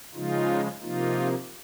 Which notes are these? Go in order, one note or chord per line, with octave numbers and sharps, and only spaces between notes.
C#3 F3 G#3 D#4 F4
C3 F3 A#3 D#4 F4